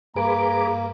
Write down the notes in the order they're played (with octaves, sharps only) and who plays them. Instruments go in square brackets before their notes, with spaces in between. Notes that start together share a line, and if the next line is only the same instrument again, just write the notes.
[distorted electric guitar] G2 [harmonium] A#3 [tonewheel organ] G#4 B4 D6 [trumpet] A#5